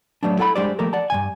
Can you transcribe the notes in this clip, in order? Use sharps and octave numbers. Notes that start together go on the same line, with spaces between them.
F#3 G3 A3 B3 D4
E4 A4 F#5 G5 B5
G3 G#3 D4 G4 C5 D5
F3 A3 A#3 G4 A4 A#4
D5 F#5 A5
G2 C#3 G#5